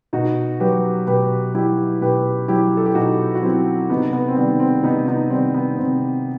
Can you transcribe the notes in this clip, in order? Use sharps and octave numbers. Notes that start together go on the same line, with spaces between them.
B2 D#4 F#4
F#3 G4 B4
B2 G4 B4
F#3 E4 G4
B2 G4 B4
F#3 E4 G4
A4
G4
B2 D#4 F#4
F#4
F#3 C4 E4
C3 B3 D#4
B3
C4
D#3 G3 B3
C4
C3 B3 D#4
B3 D#4
D#3 G3 C4
B3
C3 C4